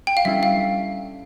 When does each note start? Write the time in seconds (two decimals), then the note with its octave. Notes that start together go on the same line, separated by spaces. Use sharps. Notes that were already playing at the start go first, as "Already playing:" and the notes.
0.07 G5
0.17 F5
0.25 G3 C#4 E4 A4 E5
0.43 F5